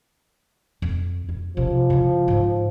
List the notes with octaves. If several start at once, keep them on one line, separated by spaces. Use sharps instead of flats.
F2
F2
C3 F3 C#4
C#3 E4
G#2 D3